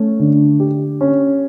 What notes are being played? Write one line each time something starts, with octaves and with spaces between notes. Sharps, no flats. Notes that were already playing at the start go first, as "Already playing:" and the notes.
Already playing: A3 C#4
D3
G4
C#4